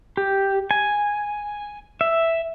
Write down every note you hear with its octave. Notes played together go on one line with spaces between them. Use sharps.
G4
G#5
E5